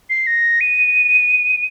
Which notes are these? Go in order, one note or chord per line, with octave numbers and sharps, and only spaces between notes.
C7
A#6
D#7